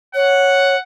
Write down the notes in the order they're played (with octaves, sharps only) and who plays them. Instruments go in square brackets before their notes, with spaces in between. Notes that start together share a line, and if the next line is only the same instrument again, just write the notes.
[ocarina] C#5 [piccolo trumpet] F#5